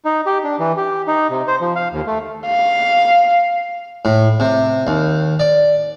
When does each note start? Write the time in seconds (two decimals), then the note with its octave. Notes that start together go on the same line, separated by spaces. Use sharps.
0.05 D#4
0.26 G4
0.44 D4
0.59 E3
0.77 G4
1.07 D#4
1.30 C3
1.48 C5
1.61 F3
1.76 F5
1.92 D#2
2.07 A3
2.47 F5
4.05 A2
4.40 C3
4.87 D#2
5.40 D5